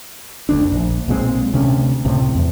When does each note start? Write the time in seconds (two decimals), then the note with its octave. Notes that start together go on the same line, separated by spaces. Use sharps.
0.49 F#1 D2 D4
0.72 A#1
1.08 B1 A#2 G#3 C4
1.54 D2 C3 C#4
2.05 C#2 A2 C3
2.35 E2